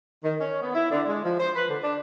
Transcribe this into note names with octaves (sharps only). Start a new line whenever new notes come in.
D#3
C#4
B3
E4
D3
G#3
F3
C5
B4
D3
D4